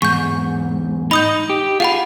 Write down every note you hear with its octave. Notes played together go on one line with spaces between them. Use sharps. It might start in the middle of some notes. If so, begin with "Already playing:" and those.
E2 G#2 C#6 G6
D#4 D#5 B5 D#6 G6
G4
F4 G#4 F5 F#5 B5